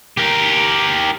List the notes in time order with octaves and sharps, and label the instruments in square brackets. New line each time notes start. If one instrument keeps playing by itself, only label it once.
[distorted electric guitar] G4 A#4